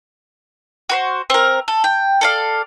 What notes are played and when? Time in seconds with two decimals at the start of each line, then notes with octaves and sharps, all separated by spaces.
0.89 F#4 B4 C5
1.30 C4 A#4
1.68 A4
1.84 G5
2.21 A4 D5 F5